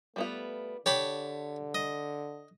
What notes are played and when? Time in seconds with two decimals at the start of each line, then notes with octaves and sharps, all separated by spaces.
0.16 G3 A3 B3 F4
0.86 D3 G4 C#5 A5 B5
1.75 D#5